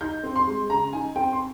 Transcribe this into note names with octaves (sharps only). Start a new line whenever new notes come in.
D#4 G6
C4
C6
G#3
C#3 A#5
D#4 G#5
C4 G5
C6